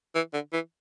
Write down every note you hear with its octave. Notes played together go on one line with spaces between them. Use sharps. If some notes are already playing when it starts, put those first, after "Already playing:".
E3
D3
E3